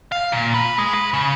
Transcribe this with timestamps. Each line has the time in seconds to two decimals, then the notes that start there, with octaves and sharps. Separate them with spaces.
0.12 F5
0.32 A#2
0.54 B4
0.78 G#3
0.94 B4
1.14 C#3